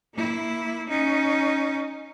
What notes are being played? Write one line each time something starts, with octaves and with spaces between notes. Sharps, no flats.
A#3 E4
C#4 D#4